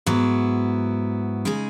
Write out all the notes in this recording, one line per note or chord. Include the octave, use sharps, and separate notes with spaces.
G#2 F#3 B3 E4
C#3 G#3 D#4 G#4